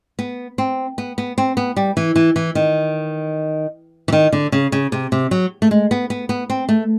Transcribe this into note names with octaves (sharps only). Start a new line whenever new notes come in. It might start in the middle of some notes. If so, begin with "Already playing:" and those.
B3
C4
B3
B3
C4
B3
G3
E3
E3
E3
D#3
E3
D#3
D3
C#3
C#3
C3
C3
F#3
A3
G#3
B3
B3
B3
C4
A3